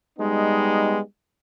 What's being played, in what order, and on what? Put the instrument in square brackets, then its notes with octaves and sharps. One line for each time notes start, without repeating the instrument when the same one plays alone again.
[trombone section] G3 G#3 B3 D#4